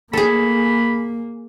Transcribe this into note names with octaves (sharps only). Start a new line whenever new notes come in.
A#3 G#4 A4 B5